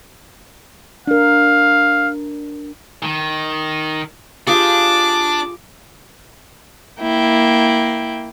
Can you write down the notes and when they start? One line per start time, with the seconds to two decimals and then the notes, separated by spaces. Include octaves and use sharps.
1.07 D4 A#4 F5
3.03 D#3
4.47 D4 F4 G4 G#4 D6
7.00 A#3 E4 G5